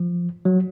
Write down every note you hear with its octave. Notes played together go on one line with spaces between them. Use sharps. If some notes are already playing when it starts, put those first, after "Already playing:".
Already playing: F3
F#3